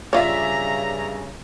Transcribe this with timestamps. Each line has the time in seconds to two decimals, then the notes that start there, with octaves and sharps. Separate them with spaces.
0.13 G2 C#3 F4 C#5 D5 E5 A#5